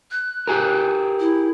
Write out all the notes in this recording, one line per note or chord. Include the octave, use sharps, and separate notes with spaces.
F#6
G4 G#4 A#4
E4